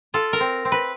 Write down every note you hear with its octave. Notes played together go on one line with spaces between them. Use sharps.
F4 A4
A#4
C4
C4
B4